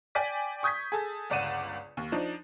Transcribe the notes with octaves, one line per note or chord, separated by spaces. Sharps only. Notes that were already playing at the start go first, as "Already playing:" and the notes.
D5 G5 G#5 D6 B6
C#6 D#6 G6 G#6 B6
G#4 A4
G1 C#2 D5 F#5 D#7 E7
D#2
F3 D4 D#4